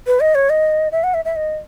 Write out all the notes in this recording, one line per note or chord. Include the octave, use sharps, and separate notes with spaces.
B4
D#5
C#5
D#5
E5
F#5
E5
E5
D#5